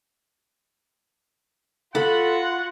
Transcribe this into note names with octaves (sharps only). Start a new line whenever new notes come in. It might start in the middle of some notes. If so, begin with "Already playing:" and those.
F4 F#4 A4 F#5 B5